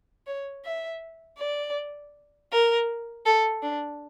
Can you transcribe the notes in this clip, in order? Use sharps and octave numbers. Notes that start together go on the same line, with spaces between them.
C#5
E5
D5
A#4
A4
D4